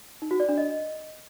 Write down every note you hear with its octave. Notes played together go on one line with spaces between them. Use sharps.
D#4
F#4
D5
D4
D#5